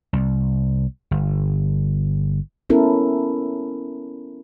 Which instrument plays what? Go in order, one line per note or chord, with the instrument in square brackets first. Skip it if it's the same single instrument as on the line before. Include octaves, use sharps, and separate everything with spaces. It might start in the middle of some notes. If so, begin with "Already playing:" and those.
[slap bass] C2
G1
[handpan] B3 C#4 E4 A4 A#4